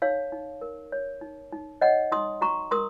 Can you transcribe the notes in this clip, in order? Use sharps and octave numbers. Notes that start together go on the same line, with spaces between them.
D#4 C#5 F5
D#4
A#4
C#5
D#4
D#4
C#5 D#5 F#5
D#4 C6 D#6
F#4 A#5 C#6
A#4 C6 D#6